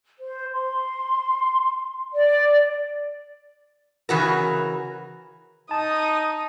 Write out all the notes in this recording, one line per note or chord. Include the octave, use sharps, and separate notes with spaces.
C5
C6
D5
C#3 E3 F#4 A#4
D#4 A5 D#6